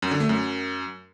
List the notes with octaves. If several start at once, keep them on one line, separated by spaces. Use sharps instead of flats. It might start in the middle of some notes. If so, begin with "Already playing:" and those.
F#2
D3
A3
F#2